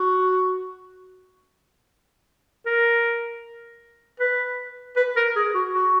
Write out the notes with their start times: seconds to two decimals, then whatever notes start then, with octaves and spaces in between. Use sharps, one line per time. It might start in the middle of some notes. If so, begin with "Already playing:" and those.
Already playing: F#4
2.66 A#4
4.20 B4
4.97 B4
5.16 A#4
5.36 G#4
5.55 F#4
5.73 F#4